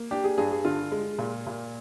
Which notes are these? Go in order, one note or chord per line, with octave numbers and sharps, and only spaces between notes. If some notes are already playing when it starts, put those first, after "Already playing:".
Already playing: A#3
D4 G4
G#4
G2 G#4
G#4
D3 F4
G#3
A#2
A#2